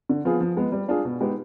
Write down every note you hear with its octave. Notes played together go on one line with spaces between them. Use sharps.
D3
F3 B3 F4 G#4
F3
G#3 B3
G3
D4 F4 G#4
B2
G#3 B3 D#4 G4